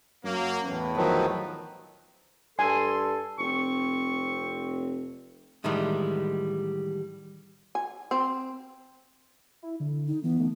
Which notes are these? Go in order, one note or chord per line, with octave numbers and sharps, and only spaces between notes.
F#2 F#3 A#3
E2 A2 B4
D#3 F3 F#3
G2 A4 G#5 C6
F1 C4 C#6
A2 D#3 E3 G3 G#3
G#5
C4
E4
D3
D#4
E3 B3
A3